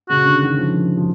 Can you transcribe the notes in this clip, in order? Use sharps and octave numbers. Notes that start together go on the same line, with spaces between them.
C#3 F#4
D3
D#3
F3
F3